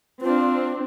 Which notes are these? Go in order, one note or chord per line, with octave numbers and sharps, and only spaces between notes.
C4 D4 F4